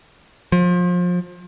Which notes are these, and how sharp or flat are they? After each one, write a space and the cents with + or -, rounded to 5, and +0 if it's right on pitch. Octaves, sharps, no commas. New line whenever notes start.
F3 +30